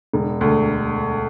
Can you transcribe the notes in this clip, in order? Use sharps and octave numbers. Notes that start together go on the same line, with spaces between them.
E1
D2